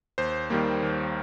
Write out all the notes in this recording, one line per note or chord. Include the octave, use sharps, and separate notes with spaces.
D#2 C5
D#3 G3 A#3
D#2